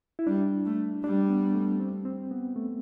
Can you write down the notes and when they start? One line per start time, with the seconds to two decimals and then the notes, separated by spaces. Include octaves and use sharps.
0.19 E4
0.27 G3 D4
0.66 A3
1.04 G3 D4
1.29 B3
1.54 A3
1.80 C4
2.05 C4
2.31 B3
2.56 A3